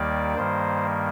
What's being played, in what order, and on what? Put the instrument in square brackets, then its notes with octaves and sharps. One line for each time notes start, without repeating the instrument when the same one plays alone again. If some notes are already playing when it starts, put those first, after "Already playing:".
Already playing: [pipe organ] D#2 D#3 G3 A#3 D5
G2 D#3 G3 A#3 C5